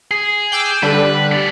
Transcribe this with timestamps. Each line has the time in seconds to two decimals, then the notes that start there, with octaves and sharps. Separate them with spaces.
0.11 G#4
0.52 G5 D6 E6
0.83 D3 G3 D4 B4
1.32 B3 D5